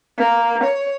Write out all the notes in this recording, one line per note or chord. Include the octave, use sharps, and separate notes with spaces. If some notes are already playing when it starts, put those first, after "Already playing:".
A#3
C#5